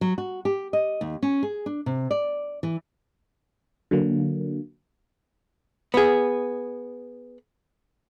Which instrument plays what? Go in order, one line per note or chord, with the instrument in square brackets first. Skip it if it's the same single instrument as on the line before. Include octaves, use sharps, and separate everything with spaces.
[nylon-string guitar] F#3
F#4
G4
D#5
D#2
C#4
G#4
D4
C3
D5
E3
[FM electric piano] D3 F#3 A#3
[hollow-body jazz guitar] B3 G#4